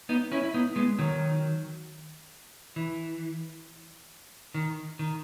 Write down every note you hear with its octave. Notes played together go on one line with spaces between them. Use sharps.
B3 D#4
C#4 E4
E4
B3 D#4
G#3 B3
D#3 F#3
E3
D#3
D#3